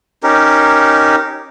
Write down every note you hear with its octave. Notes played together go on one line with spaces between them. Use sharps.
C#4 D#4 G4 A#4